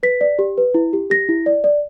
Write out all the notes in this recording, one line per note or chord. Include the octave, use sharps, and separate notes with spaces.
B4 B6
D5
G4
B4
E4
G4
G4 A#6
E4
D5
D5